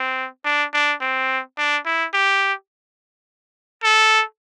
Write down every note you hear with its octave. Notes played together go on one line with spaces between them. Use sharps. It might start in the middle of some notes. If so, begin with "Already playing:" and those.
Already playing: C4
D4
D4
C4
D4
E4
G4
A4